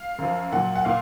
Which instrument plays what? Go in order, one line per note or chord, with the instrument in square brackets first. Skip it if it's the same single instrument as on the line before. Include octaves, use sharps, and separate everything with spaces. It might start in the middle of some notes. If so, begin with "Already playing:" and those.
Already playing: [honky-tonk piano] F5
F#2 F3
A#2 F#3 F#5
F#5
A#2 F5